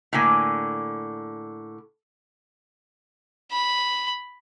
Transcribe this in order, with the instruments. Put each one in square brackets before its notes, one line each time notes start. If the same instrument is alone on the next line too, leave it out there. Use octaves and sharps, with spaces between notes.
[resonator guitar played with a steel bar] A2 D3 A#3 G#5
[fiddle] B5